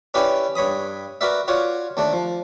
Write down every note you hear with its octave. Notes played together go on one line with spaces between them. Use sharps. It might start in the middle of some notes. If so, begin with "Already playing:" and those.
C#4 E4 G4 B4 D5
G2 C#5 B5 D#6
F#4 A#4 B4 D5 E5
F4 F#4 C#5 D5
D#2 A3 D4
F3